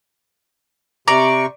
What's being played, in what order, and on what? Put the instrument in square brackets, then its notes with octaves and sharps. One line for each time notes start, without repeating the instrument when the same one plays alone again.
[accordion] C3 C#6 [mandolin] D5 [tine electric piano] A#5